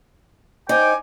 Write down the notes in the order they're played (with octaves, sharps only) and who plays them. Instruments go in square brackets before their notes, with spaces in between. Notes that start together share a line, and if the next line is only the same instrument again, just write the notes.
[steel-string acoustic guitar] D#4 [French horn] C5 [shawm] G5 [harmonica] G#5 D6